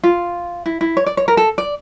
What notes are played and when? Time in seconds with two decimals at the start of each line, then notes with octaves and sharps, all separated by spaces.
0.03 F4
0.66 E4
0.81 E4
0.97 C#5
1.06 D5
1.17 C#5
1.28 A#4
1.37 A4
1.58 D5